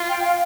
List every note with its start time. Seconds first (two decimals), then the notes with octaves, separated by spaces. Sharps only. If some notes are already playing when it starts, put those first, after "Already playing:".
Already playing: F4
0.09 G5
0.24 F5